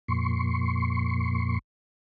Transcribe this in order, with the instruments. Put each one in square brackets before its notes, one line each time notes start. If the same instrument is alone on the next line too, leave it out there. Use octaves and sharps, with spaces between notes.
[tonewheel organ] F2 A#2 C6 C#6